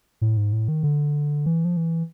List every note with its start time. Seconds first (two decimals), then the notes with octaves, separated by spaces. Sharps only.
0.21 A2
0.37 G#2
0.52 A2
0.68 D#3
0.83 D3
1.46 E3
1.65 F3
1.77 E3